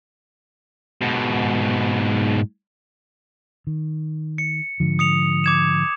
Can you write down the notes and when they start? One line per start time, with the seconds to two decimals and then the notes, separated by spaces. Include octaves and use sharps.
1.01 G#2 B2
3.67 D#3
4.38 C#7
4.80 G#2 D3 F3
4.99 D#6 C#7 F7
5.44 D6 G#6 E7